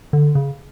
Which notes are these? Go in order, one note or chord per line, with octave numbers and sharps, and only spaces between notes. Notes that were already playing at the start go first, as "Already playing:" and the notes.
D3
C#3